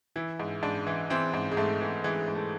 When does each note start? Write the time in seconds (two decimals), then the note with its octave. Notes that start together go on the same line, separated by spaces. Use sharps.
0.16 E3 E4
0.40 G#2
0.63 G#2 D4
0.87 E3
1.10 E3 C4
1.34 G#2
1.52 G#3
1.57 G#2 A3
1.81 E3
2.04 E3 G#3
2.28 G#2
2.35 A3